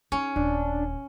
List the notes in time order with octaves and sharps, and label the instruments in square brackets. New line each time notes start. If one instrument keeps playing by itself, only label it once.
[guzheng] C#4 [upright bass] D#4
[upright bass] D#1 [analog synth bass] D4